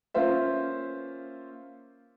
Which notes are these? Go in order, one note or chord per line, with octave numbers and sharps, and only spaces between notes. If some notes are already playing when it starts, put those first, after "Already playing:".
A#3 C#4 F4 C5 E5